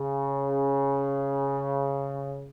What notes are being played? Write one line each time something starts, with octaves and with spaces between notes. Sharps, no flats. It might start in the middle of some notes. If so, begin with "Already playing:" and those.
Already playing: C#3